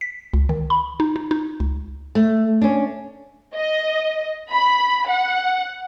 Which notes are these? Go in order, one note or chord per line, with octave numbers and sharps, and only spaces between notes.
B6
C#2
D#3
B5
D#4
D#4
D#4
C#2
A3
C#4 D4
D#5
B5
F#5